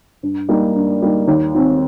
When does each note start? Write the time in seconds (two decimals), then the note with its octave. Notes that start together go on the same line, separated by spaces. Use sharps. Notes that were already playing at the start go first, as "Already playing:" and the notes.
0.23 G2
0.49 G3 A#3 D#4
0.76 G2
1.02 G3 A#3 D#4
1.28 D#2
1.55 D#3 C4